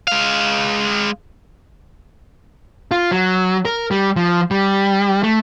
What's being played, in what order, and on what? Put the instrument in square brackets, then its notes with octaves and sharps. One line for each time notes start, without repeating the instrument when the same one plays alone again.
[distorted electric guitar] G#3 F5
[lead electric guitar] F4
F#3
A#4
G3
F3
G3
A3